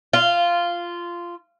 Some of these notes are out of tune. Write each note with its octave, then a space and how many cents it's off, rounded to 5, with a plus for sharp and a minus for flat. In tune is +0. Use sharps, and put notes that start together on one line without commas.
F4 -10